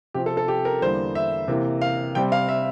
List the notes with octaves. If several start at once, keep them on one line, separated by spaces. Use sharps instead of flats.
C3 F3 C4 G4
A4
A4
G4
A#4
E2 D3 G3 A#3 C5
E5
C3 E3 A#3
F5
C3 G3 C4 G5
F5
E5